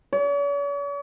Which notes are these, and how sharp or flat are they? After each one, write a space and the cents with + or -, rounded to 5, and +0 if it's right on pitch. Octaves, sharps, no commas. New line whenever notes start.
C#5 +45